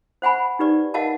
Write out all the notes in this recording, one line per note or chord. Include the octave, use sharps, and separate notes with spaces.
C5 F#5 G#5 B5
D#4 G4 B4 D5
A#4 D#5 F5 F#5 A5